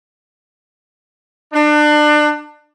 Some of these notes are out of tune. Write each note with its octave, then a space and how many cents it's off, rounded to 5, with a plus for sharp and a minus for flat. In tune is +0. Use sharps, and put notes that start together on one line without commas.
D4 +30